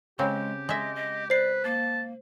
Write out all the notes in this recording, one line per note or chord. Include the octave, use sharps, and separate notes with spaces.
C#3 G#3 C4 G4
G#3 D#5 E5
D#5
B4 C5 D5 C7
A#3 A5